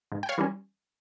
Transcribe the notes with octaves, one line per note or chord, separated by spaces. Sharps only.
G#2
G5
C#5 F5
E3 G3 C#4